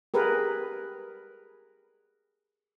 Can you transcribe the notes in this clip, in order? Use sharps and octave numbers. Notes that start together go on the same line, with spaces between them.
G4 G#4 A#4 B4